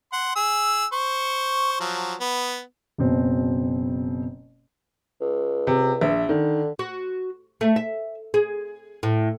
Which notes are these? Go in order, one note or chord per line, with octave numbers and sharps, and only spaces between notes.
F#5 C6
G#4 E6
C5 C#6
F3 F#3
B3
F#1 B2 C4
C#2
C3
A#1 E5
D3 D#3
F#4
A3
E5
G#4
A2